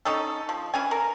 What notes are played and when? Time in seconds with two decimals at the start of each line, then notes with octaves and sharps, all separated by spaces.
0.05 C#4 D#4 A4
0.49 F3
0.74 E3 C#4 G#5
0.91 A#4